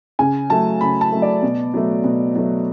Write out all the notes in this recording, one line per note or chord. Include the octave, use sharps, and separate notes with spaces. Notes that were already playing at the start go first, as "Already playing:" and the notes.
C#3 G#5
F#3 A3 A5
C#3 B5
A5
F#3 A3
D5
B2
F#3 A3
B2
F#3 A3